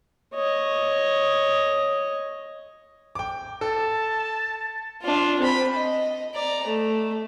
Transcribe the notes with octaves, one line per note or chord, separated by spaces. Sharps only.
C#5 D#5
G5 D6
A4 A5
D4 F4
C4 B5
D#5
D5 A#5
A3